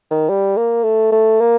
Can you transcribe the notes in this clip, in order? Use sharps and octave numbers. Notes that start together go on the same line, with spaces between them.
D#3
G3
A#3
A3
A3
A#3